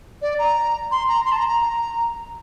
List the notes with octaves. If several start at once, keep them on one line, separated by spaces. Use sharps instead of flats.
D5
A#5
C6
A#5
C6
A5
A#5
A#5